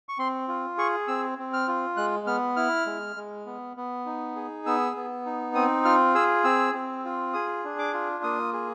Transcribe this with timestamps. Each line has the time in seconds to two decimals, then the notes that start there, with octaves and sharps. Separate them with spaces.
0.09 C#6
0.18 C4 C6
0.48 F4
0.78 G#4 C#6
1.08 C4 E6
1.38 C4
1.53 F6
1.68 F4
1.97 G#3 F#6
2.27 B3 F6
2.56 E4 F6
2.86 G#3
3.16 G#3
3.46 B3
3.77 B3
4.06 D#4
4.36 G#4
4.66 B3 E6
4.96 B3
5.26 D#4
5.55 C4 D#6
5.85 F4 F6
6.15 G#4 E6
6.44 C4 E6
6.74 C4
7.05 F4
7.33 G#4 D#6
7.64 D4
7.79 D6
7.94 F4
8.23 A#3 D#6
8.53 G#4